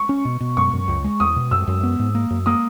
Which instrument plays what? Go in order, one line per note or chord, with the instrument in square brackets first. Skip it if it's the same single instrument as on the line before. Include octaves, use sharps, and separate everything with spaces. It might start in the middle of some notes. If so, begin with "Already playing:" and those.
Already playing: [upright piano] C#6
[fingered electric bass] C#4
B2
B2
[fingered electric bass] F#2 [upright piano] C#6
[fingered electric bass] F#2
C#2
G#3
[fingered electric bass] E2 [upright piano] D#6
[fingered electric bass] B2
[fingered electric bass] F#2 [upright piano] E6
[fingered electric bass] F#2
B3
G#2
A#3
F#2
[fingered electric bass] A#3 [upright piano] D#6